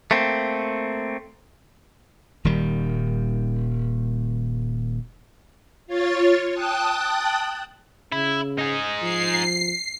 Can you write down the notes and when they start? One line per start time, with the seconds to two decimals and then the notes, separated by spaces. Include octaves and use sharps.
0.11 A3 A#3 C4
2.45 D#1 D#3 G3
5.87 F4 C#5 A6
6.53 G5 A5 D#6 F#6
8.12 C#3 E4
8.58 D#4 G#4
9.02 F3 C7